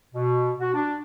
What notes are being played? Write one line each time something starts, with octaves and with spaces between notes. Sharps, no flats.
B2
F#4
D4